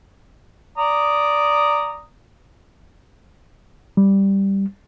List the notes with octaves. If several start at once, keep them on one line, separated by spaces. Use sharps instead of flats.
D5 A#5 D#6
G3